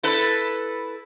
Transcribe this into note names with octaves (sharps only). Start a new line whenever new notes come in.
E4 A4 B4